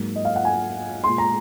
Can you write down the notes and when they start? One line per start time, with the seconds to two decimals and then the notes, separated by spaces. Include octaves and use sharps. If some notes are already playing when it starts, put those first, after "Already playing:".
Already playing: G#2 F#3 A#3
0.16 D#5
0.25 F5
0.36 F#5
0.45 G#5
1.04 A#2 G#3 C6
1.18 A#5